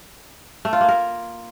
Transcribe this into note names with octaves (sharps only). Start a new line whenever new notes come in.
A3
F4
A#3
A#4